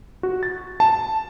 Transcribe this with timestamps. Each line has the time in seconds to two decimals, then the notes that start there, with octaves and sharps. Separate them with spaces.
0.23 F#4
0.43 A6
0.80 A5